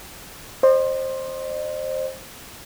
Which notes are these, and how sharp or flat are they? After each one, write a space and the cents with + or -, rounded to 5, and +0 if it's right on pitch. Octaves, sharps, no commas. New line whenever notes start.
C5 +15 D#5 -40